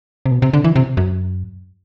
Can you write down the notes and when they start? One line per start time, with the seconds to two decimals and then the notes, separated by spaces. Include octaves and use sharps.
0.26 C3
0.31 B2
0.42 C3
0.53 D3
0.64 E3
0.76 C3
0.97 F#2